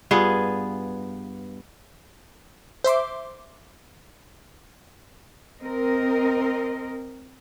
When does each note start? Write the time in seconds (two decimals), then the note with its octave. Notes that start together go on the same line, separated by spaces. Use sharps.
0.11 G2 B3 F4 G#4
2.84 C5 E5 C6 D6
5.61 C4 A#4 D#5